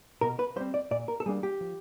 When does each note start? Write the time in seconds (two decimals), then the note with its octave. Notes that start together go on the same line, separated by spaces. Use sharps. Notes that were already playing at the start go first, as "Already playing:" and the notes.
0.21 B2 A#4
0.39 B4
0.56 G3 C5
0.61 C4
0.74 D5
0.91 A#2 D5
1.08 A#4
1.20 A4
1.26 G3 A#3 D4 G#4
1.43 G4
1.61 F3